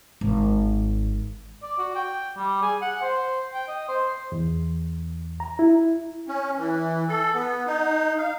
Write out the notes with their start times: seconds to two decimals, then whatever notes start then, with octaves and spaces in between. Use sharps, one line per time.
0.21 G#1
1.63 D5
1.78 F#4
1.95 G5
2.37 G3
2.62 G#4
2.82 F#5
3.02 C5
3.54 G5
3.68 D#5
3.89 C5
4.32 E2
5.40 A#5
5.59 E4
6.28 C#4
6.58 E3
7.08 A4
7.34 B3
7.67 D#4
8.18 F5